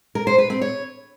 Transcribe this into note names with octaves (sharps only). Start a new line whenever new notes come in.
A#4
C5
B4
C4
C#5